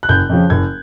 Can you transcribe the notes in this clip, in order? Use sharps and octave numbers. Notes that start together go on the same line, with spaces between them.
F#6
F#1 G6
F2 C#3 F3
F#1 G#6